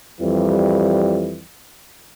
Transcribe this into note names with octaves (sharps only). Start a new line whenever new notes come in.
F2 E3 G3